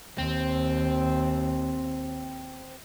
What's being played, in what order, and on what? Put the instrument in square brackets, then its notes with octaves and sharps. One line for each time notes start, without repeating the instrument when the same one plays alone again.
[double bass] D#2 [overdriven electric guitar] C4